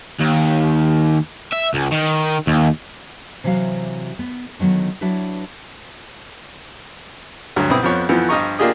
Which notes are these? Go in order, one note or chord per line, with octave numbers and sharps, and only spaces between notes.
D#2
E5
C#2
D#3
D#2
C3 E3 F#3 F#4 F5
B3
D3 D#3 F#3 B3
F#3 D4 E4 F#4 B4
D2 G2 F#3
B1 C4 E4 B4 G5 D#6
F2 F3 B3 C#5
F2 E3 F3 B3 C4
G2 F3 F4 D#5 A#5 C#6
A#3 D4 F4 G4 G#4 D#5